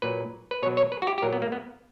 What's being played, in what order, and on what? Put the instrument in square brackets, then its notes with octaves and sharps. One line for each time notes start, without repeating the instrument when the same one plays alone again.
[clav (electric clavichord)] A#2 F#3 B4
B4
B2 C#5
F#3
C#5
B4
F#4
G4
G4
A#2 F#3 A#4
B3
A#3
B3